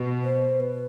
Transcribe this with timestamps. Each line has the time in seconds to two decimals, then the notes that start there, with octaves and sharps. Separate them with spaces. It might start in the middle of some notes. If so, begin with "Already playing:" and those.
Already playing: B2
0.23 C5
0.60 B4